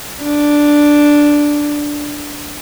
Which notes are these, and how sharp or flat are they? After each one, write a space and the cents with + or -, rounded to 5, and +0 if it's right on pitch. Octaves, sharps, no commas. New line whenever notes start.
D4 +0